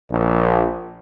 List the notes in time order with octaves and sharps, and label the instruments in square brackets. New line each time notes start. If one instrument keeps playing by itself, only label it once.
[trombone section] A#1